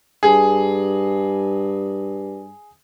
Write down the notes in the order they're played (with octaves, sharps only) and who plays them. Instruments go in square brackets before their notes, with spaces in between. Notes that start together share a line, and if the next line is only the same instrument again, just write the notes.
[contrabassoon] G2 [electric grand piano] G#4